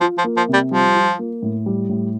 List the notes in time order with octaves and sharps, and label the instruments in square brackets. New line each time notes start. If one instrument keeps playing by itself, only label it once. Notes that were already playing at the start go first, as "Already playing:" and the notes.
[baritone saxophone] F3 [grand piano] F4
[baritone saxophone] F3
[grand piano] A#3
[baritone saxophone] F3
[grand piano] C3 [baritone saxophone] G3
[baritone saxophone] F3 [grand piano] G3
[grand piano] F4
A#3
A2
G3
A2